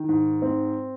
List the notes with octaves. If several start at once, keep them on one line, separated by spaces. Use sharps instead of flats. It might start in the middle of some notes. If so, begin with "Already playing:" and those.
Already playing: D#3
G#2
C4